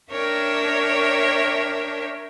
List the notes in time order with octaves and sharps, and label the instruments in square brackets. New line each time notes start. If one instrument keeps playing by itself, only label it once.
[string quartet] D4 A#4 C#5 E5 G5